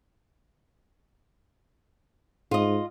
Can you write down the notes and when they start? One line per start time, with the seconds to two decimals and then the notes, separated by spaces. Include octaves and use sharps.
2.51 G#2 F4 D#5